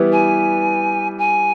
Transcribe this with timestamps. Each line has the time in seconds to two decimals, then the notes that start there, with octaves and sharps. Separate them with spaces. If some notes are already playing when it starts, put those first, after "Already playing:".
Already playing: E3 G3 B3 E4
0.12 G#5
1.18 G#5